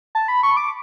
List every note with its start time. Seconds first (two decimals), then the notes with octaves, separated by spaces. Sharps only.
0.15 A5
0.28 B5
0.43 C#6
0.57 D6